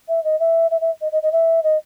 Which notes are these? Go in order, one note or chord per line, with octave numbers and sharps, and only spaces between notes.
E5
D#5
E5
E5
E5
D#5
D#5
D#5
E5
D#5